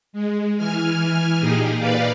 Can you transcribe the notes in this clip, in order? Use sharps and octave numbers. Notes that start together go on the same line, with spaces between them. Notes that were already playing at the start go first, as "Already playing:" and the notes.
G#3
E3 G#5 F6
A#2 D#4 G4 G#4
A#2 D#4 B4 D5 F5